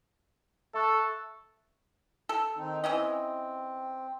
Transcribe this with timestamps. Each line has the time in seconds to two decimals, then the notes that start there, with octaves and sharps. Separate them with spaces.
0.74 A4 E5 C#6 F#6
2.29 A4
2.56 D#3 C4 D#4
2.84 E3 C4 C#4 D#5